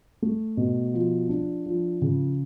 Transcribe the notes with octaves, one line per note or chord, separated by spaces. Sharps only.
A3
B2
F3
D4
F3
C#3